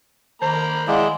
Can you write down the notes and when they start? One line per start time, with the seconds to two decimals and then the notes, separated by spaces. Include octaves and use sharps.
0.42 D#3 A#3 C5 A#5 B5
0.88 E3 G#3 E4 D5 F5 F#5